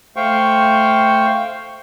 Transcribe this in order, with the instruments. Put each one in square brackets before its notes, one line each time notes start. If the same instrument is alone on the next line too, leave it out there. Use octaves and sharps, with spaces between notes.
[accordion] A3 C5 F5 G5 C#6